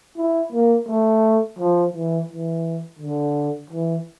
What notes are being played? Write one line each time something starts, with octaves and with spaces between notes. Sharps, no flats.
E4
A#3
A3
F3
E3
E3
D3
E3